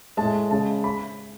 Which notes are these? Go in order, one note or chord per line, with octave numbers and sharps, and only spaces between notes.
A2 G#3 A5
C#3 G#3 A5
B5